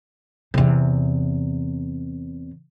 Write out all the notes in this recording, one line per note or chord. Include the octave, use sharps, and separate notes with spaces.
E2 C3